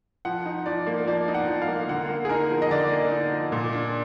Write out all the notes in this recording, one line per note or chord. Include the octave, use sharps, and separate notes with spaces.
F3 F#5
D#4
F3 D5
A#3
F3 D5
D#4
F#5
F3
F5
A#3
D3 F#5
A#3
G#4
D#4 A#4
F3
D#5
D3 D5
A#3
D#4
F3
A#2
D4